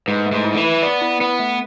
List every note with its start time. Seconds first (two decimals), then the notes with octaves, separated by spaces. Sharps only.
0.07 G#2 B4
0.26 A3
0.32 G#2
0.45 E4
0.54 D3
0.58 E3
0.64 B4
0.83 B3 D5
1.01 E4
1.20 B3 B4
1.39 A3